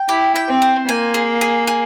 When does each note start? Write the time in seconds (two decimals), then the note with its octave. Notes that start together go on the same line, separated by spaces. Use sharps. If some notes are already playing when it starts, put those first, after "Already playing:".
Already playing: G5
0.09 E4 G4
0.36 G5
0.49 C4
0.62 C5
0.88 A#3 G#5
1.14 G#4
1.41 G#4
1.67 G#4